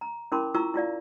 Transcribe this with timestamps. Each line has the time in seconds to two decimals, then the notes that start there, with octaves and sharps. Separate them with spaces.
0.01 A#5
0.32 C#4 E4 A#4 B5 C6 D6
0.55 E4 F4 A#5 C#6 E6
0.74 E4 F4 D5 F5